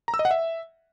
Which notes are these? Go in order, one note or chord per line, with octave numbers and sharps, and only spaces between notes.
A#5
E6
D#5
F#5
E5